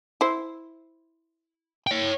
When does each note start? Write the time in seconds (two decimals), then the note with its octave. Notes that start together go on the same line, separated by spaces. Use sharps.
0.21 E4 C5
1.87 C#5 G5